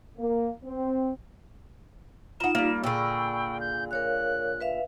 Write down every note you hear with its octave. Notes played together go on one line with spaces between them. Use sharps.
A#3
C4
D#4 F4 F#5 A#5 E7
G3 A#3
A#2 D3 G#4 G5 B5 C#6 E6
G6
A#4 C#5 F5 F#6
B4 E5 F5